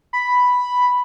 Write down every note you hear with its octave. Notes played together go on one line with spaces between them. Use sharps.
B5